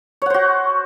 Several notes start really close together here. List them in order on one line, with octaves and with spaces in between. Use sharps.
C#5 F#5 C5 F#4